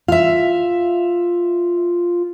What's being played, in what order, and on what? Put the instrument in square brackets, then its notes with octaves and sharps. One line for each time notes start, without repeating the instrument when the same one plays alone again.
[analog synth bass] F4 [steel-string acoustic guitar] E5 F5